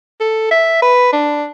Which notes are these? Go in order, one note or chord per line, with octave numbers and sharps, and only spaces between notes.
A4
E5
B4
D4